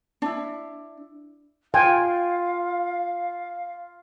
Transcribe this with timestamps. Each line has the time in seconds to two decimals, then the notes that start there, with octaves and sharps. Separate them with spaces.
0.22 D4 E4
1.74 F4 F5 G5 G#5